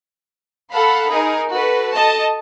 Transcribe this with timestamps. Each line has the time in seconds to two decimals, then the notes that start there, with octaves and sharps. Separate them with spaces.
0.72 A4 F5 F#5 B5
1.10 D#4 G#4 A#4
1.51 F#4 A4 B4
1.95 A4 D#5 A5